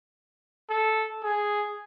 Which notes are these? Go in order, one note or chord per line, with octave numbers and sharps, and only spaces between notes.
A4
G#4